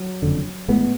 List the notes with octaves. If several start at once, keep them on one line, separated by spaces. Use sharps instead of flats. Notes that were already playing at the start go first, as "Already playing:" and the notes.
Already playing: F#3
F#1 F2 D3
A1 A2 G#3 B3